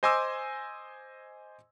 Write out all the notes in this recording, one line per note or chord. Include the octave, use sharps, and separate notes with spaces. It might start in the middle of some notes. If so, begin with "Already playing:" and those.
C5 D#5 G#5 C6 D6 E6